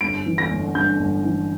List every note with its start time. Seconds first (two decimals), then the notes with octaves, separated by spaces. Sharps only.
0.01 G1 D7
0.26 E3
0.38 A#6
0.51 G1
0.74 G2 G6
0.99 G1
1.24 E3